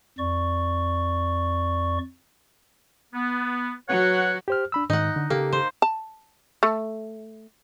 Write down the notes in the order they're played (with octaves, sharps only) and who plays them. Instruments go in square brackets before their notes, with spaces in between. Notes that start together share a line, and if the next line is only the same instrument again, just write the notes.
[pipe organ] F2 D5 C#6
[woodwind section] B3
[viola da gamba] F#3 F#4 [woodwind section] B4 C#5 F#5
[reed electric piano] G4 C5 F6
D4 B5 E6
[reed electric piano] G#2 D#3 [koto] D#4 F#5
[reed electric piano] D3
[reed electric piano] C#3 G4 A4 [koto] A#3
[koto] C5
[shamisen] A5
A3